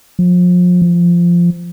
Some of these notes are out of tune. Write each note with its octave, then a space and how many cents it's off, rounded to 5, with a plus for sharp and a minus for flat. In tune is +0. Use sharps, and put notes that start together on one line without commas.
F3 +35
F3 -10